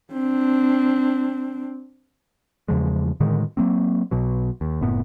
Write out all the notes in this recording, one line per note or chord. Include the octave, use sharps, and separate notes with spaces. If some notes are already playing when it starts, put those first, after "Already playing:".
C4 D4
E2 C#3 F3 G#3
A2 D3 D#3 G#3
F#3 A#3 C4
B1 B2 F#3
D#2
F#1 A2 B3